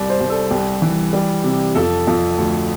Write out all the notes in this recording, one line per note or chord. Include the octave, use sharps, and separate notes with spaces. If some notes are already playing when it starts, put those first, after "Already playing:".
Already playing: C2 D5
C5
C2
A4
C2 G4
E3
G3
C3
F2 A4
F2
D2